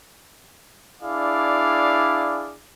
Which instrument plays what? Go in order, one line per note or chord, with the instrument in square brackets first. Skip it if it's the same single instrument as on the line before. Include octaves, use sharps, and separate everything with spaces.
[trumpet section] D4 E4 G#4 D5 F5